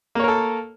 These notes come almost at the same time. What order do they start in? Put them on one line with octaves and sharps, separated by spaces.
A#3 C#5 A#4 A4